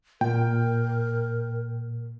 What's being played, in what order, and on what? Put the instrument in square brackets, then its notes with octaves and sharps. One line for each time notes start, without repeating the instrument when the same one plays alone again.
[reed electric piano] A#2 [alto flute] A#4 [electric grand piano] G5